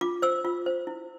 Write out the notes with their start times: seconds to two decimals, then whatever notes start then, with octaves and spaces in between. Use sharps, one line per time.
0.01 F4 D6
0.22 C5 E6
0.45 F4
0.66 C5
0.87 E4